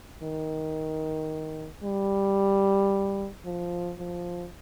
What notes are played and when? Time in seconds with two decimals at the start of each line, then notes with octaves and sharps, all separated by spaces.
0.22 D#3
1.83 G3
3.45 F3
3.98 F3